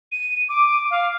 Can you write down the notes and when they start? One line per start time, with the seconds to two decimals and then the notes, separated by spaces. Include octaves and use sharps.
0.12 D#7
0.49 D6
0.91 F5